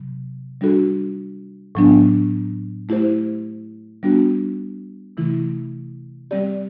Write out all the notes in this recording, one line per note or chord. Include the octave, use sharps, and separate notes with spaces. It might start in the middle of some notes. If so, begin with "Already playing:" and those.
Already playing: C3 F#3
G3 D4 F#4 A4
A2 F#3 B3 D4
A3 E4 G4 C5
G3 B3 D4 F#4
C3 E3 A3 E4
G3 C4 G4 D5